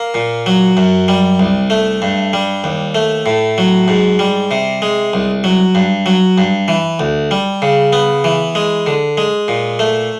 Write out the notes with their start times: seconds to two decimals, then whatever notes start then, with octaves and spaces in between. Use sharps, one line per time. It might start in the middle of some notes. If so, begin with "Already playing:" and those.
Already playing: A#3
0.14 A#2
0.46 F#3
0.77 F#2
1.08 G3
1.39 C2
1.70 A3
2.02 G2
2.33 G3
2.64 D#2
2.95 A3
3.26 A2
3.58 F#3
3.88 G#2
4.19 G3
4.51 C3
4.82 G#3
5.13 C2
5.44 F#3
5.75 G2
6.06 F#3
6.38 G2
6.68 E3
7.00 D2
7.31 G3
7.62 C#3
7.93 B3
8.24 E3
8.55 G#3
8.87 D3
9.18 G#3
9.48 A#2
9.79 A3